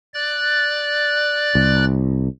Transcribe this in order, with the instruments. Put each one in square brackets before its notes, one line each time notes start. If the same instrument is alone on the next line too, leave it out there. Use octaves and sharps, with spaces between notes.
[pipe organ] D5 F#6 A6
[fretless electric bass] C2